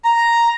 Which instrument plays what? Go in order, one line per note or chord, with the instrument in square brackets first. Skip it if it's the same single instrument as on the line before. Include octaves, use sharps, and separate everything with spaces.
[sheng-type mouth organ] A#5